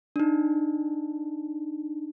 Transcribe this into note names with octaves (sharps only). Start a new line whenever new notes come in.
D4 D#4